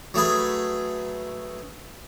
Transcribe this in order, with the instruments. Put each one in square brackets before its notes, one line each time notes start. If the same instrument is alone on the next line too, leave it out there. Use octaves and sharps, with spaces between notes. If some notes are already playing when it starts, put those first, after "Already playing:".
[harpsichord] F#3 A3 G#4 B4